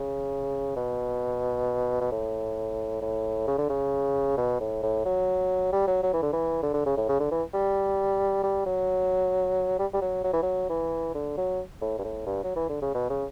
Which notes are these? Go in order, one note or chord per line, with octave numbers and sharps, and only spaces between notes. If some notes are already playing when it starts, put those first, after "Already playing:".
Already playing: C#3
B2
B2
A2
A2
C#3
D3
C#3
B2
A2
A2
F#3
G3
F#3
F#3
E3
D3
E3
D3
D3
C#3
A2
C#3
D3
E3
G3
G3
F#3
G3
G3
F#3
F#3
E3
F#3
E3
D3
F#3
A2
G2
A2
G2
F#3
E3
D3
C#3
B2
C#3